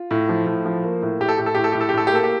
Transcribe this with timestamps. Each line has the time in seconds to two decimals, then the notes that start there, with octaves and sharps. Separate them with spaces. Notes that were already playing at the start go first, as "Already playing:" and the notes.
Already playing: F4
0.11 A2
0.29 F3
0.47 A2
0.66 F3
0.84 A#3
1.02 A2
1.20 A2 G4
1.28 A4
1.38 A2 G4
1.46 A4
1.55 A2 G4
1.64 A4
1.72 A2 G4
1.81 A4
1.89 G4
1.94 A2 A4
2.07 G4
2.12 A#3 A4
2.24 G4